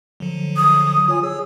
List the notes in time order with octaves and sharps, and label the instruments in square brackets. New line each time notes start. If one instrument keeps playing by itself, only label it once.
[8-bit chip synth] D3 F3 F#3
[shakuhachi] D#6
[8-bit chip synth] F4 C#5 G#5
G#4 C#5 E6